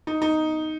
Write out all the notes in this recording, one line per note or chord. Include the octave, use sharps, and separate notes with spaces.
D#4
D#4